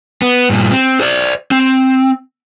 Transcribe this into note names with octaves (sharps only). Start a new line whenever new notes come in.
B3
G2 A#2
C4
C5 D5
C4